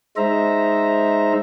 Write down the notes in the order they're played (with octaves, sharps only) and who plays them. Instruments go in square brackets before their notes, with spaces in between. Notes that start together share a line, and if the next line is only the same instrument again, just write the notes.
[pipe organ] G#3 D#4 C5 E5 A#5